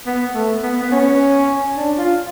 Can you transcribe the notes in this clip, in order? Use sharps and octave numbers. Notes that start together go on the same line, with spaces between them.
B3
A3
B3
B3
C#4
D4
F4